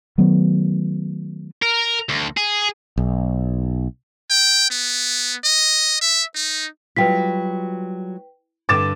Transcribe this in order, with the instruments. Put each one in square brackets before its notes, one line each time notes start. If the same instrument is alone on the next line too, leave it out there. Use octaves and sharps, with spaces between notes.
[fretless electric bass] D#3 F#3 A3 B3
[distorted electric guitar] A#4
D2
G#4
[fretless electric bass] B1
[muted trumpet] G5
B3
D#5
E5
D#4
[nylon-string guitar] F#3 G3 F4 [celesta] B4 G5 B6
[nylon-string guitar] G2 D3 [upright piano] D6 A6 E7